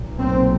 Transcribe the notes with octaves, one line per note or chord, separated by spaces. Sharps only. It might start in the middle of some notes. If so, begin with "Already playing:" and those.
Already playing: B1 A#2
C4